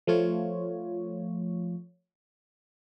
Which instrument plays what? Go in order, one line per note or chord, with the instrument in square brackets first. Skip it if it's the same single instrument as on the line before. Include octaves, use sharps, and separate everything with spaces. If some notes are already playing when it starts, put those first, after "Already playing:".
[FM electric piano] F3 A3 F4 C#5